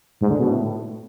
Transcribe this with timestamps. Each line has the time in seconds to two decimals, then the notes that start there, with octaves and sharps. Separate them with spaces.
0.21 G#2
0.30 D3
0.40 B2
0.49 A2